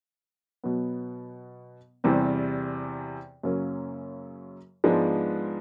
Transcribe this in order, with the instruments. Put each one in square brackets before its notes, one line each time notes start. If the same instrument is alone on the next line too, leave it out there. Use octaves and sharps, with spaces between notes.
[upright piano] B2 F#3 B3
E2 C3 E3 G3 C4
F#2 C#3 F#3 A#3 C#4
G#2 F3 G#3 B3 D4